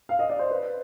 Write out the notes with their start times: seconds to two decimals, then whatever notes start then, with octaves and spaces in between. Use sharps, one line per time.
0.09 F5
0.19 D#5
0.29 D5
0.39 C5
0.50 B4